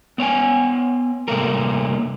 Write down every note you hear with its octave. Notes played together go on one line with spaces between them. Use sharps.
B3 C#5 G5 G#5
C3 G3 A3 A#3 A4 A#4